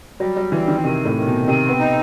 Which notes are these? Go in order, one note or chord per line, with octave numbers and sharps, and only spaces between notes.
F#3 G3
F#3
E3 C4
D#3
C3 D#3
A2
D#3
B2
C3 C4
B3
D#4